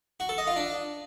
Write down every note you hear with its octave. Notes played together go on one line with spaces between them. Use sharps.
F#4
A4
D#5
F4
D4